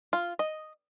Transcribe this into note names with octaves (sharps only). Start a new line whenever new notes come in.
F4
D#5